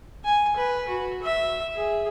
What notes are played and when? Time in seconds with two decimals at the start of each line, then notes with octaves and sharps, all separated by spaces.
0.25 G#5
0.56 B4
0.88 F#4
1.23 E5
1.75 G#4